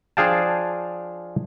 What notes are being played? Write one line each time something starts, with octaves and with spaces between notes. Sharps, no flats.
F3 D4 G#4 F5 G5 A5